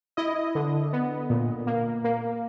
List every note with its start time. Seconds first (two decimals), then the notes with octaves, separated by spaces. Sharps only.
0.17 E4 D#5
0.55 D3
0.93 B3
1.30 A#2
1.67 A#3
2.04 A#3